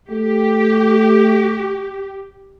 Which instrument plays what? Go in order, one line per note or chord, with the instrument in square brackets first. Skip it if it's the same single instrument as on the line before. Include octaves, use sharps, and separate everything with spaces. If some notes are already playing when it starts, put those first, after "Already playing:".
[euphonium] A3 [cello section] G4